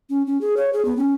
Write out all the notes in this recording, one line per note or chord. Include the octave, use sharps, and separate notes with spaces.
C#4
C#4
G#4
C#5
G#4
B3
C#4